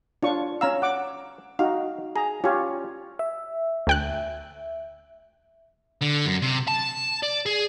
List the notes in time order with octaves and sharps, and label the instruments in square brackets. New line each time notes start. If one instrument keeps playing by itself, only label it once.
[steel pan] D4 F4 C#6 [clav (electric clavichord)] C#5
[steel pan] C#4 E6 [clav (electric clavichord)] F5 A#5
[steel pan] F#5 D6
[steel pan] D#4 F#4 [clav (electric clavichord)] F5
[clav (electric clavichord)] G#4 [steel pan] A#5
[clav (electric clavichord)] C#4 C#5 [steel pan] F4 G4
[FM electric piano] E5
[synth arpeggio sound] D2 G5 F#6
[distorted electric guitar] D3
F#2
C3
A5
D5
G#4